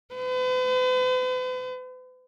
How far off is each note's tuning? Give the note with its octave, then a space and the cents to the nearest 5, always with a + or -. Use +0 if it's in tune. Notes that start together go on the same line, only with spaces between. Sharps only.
B4 +45